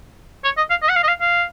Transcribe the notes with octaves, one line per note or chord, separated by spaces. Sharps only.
C#5
D#5
F5
D#5
F#5
F5
D#5
F5
F5